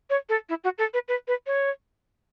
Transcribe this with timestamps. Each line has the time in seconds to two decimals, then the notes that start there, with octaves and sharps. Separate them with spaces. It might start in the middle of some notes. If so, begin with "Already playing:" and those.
0.10 C#5
0.29 A4
0.49 E4
0.64 F#4
0.78 A4
0.94 B4
1.08 B4
1.28 B4
1.47 C#5